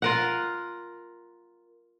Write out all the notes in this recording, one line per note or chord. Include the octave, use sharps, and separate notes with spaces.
F4 A#4 F#5